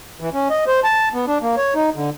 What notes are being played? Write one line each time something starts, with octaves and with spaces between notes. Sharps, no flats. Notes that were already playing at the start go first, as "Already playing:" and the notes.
E3
C#4
D#5
C5
A5
B3
D4
A#3
C#5
D#4
D3